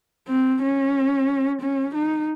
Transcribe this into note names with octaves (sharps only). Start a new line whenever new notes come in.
C4
C#4
C#4
D#4